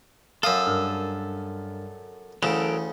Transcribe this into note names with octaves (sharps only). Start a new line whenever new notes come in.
F#2 A4 F5 D#6 E6
G2 A#4 F6
D2 C#3 E3 F#3 A4 A#4